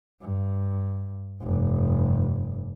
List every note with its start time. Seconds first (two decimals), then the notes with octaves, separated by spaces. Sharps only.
0.21 G2
1.42 F1 G2